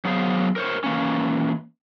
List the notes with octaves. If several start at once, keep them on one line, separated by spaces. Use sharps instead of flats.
F#3 B3 G#4 C5 F5
A#4 C5 C#5
E3 A#3 C#4